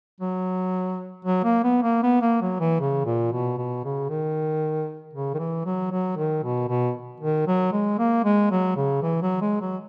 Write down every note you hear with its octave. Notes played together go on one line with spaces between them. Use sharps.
F#3
F#3
A#3
B3
A#3
B3
A#3
F#3
E3
C#3
A#2
B2
B2
C#3
D#3
C#3
D#3
E3
F#3
F#3
D#3
B2
B2
D#3
F#3
G#3
A#3
G#3
F#3
C#3
E3
F#3
G#3
F#3